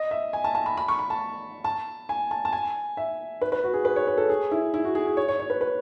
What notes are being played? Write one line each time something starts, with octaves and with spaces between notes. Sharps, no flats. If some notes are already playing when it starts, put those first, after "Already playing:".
Already playing: D#5
E5
G#5
A5
A5
B5
B5
C#6
B5
A5
A5
G#5
A5
A5
G#5
E5
B4
B4
F#4
G#4
B4
C#5
B4
A4
G#4
E4
E4
F#4
G#4
G#4
C#5
C#5
C#5
B4
B4